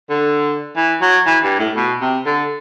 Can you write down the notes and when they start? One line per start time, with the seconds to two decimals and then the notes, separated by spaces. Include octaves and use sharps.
0.10 D3
0.76 E3
1.01 F#3
1.26 E3
1.43 G2
1.59 A2
1.76 B2
2.01 C3
2.26 D3